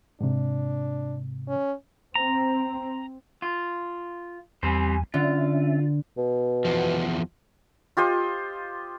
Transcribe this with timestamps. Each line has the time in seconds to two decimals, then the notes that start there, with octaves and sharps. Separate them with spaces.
0.21 G#2 C3 D4
1.48 C#4
2.15 C4 A#5
3.42 F4
4.63 E2 G3 C4 C5 G#5
5.14 D3 C#4 F4 E5
6.17 B2
6.65 E2 F3
7.97 F4 G4 C5 D#5